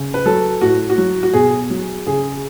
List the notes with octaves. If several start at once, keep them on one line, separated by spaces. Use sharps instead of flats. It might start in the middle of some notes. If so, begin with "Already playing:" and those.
Already playing: C#3
B4
F#3 A4
A2 F#4
F#4
F#3
F#4
B2 G#4
F#3
C#3 G#4